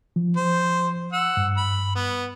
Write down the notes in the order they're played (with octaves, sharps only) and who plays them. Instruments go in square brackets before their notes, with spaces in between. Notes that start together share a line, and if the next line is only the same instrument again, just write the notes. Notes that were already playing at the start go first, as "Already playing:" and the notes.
[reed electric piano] F3
[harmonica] C5
F#5 E6
[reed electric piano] G2
[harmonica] B5
B3